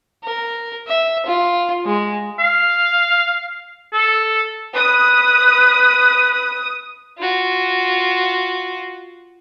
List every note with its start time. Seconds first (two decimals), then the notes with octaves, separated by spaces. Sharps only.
0.24 A#4
0.88 E5
1.26 F4
1.86 G#3
2.39 F5
3.93 A4
4.76 B4 D#6
7.19 F4 F#4